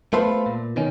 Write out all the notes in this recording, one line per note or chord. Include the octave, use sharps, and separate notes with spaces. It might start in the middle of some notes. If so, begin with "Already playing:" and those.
A3 B3 F4 A4 B4 C5
A#2
B2 D#3 C#4